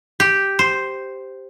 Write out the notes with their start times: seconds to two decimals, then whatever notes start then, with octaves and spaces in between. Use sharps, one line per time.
0.20 G4
0.59 C5